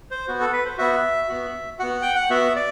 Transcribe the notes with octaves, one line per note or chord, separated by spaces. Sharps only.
C5
B3 F#4
A4
B4
C5
B3 F#4 E5
B3 F#4
B3 F#4 F#5
G5
F#5
B3 F#4 E5
D5